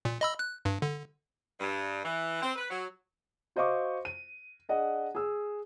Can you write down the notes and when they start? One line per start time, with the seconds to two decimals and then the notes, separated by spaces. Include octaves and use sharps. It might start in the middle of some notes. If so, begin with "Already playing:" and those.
0.05 A#2
0.21 D#5 B5 E6
0.39 F#6
0.65 G2
0.82 D3
1.60 G2
2.04 E3
2.42 C4
2.56 B4
2.70 F#3
3.56 F#4 C5 D#5 F5 C#6 D6
4.05 D#7
4.69 D4 G#4 D#5 F#5
5.15 G#4 E6